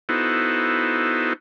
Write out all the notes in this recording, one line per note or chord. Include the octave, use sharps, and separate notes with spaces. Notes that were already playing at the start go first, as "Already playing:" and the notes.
B3 D#4 E4 F#4 A4 C5